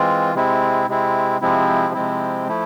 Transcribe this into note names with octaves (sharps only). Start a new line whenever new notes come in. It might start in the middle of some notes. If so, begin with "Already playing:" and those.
Already playing: E3 G#3 C4 F4
C3 G#3 C4 E4
C3 G#3 C4 E4
C3 F3 G#3 C4 E4
C3 F3 G#3 C4 E4
F3 A3 E4